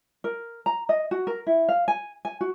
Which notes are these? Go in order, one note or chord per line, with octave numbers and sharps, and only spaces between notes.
A#4
A#5
D#5
F#4
A#4
E4
F5
G#5
G#5
F#4